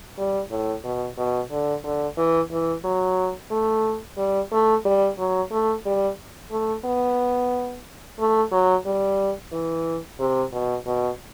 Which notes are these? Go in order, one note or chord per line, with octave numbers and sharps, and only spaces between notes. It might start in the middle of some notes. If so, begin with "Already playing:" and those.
G3
A2
B2
B2
D3
D3
E3
E3
F#3
A3
G3
A3
G3
F#3
A3
G3
A3
B3
A3
F#3
G3
E3
C3
B2
B2